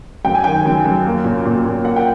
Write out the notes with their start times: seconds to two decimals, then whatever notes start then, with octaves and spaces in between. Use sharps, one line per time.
0.25 F#2 G5
0.35 G#5
0.44 D#3 G5
0.65 F#2
0.85 F#2
1.05 A#3
1.24 A#2
1.45 A#2
1.65 A#2
1.85 A#3 F#5
1.96 G5